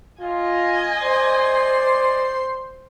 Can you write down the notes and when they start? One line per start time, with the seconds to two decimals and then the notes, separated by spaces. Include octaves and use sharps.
0.21 F4 D#5 G#5
1.01 C5 D5 C6